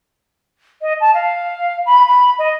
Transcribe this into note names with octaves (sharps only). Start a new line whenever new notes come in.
D#5
A5
F5
B5
B5
D#5